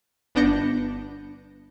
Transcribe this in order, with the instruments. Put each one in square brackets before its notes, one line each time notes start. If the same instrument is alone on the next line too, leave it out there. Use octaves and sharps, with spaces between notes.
[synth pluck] G1 B3 D4 G6 A#6 C#7